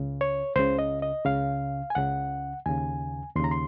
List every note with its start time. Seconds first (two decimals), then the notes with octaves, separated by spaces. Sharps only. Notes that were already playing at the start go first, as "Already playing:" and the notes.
Already playing: C#2 C#3
0.21 C#5
0.56 C#2 C#3 C5
0.79 D#5
1.02 D#5
1.25 C#2 C#3 F5
1.90 G#5
1.95 C#2 C#3 F#5
2.66 D#2 C#3 G#5
3.35 D#2 C6
3.39 C#3 A#5
3.51 C6